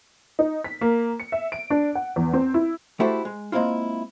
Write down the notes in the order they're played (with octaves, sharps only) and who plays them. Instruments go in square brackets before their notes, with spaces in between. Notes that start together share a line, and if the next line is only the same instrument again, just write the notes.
[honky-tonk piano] D#4
B6
A#3
C#7
E5
D7
D4
F#5
E2
C4
E4
[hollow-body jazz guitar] A3 E4 F#4 G4 A4 C5
G#3
G#3 A#3 C4 E4 F4